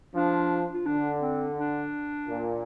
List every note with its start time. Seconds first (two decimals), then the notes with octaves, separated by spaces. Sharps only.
0.15 F3 D4
0.74 F4
0.86 D3 D4
1.21 C4
1.57 D4
2.28 A#2